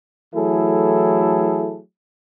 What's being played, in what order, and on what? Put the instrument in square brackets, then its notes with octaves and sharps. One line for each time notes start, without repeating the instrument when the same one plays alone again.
[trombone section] E3 F#3 A3 E4 G#4 A4